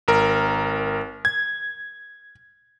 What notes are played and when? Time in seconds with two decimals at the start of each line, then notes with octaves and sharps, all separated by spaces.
0.08 G#1 A#4
1.25 G#6